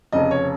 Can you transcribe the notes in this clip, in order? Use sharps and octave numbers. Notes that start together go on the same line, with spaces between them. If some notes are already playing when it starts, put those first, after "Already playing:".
F1 F2 C#3 D#5
C#5